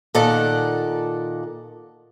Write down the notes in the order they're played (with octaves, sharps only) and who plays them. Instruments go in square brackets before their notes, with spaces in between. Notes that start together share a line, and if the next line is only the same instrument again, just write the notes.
[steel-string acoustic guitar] A#2 D#3 A4 D5 F#5 A5